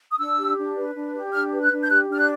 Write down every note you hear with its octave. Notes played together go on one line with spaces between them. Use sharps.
D#6
D4 E6
G4
D4
B4
D4
G4
D4 F6
B4
F#6
D4
G6
G4 F#6
D4 F6
F#6